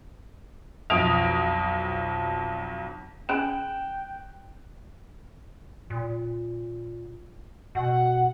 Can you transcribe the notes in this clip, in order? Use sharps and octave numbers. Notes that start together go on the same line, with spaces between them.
B1 F2 D#6 D7 F7
C#4 G#4 G5 B5 F#6 D7 E7
A#2
B2 F#5